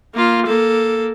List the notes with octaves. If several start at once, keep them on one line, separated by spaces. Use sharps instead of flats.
A#3 F4
A#3 A4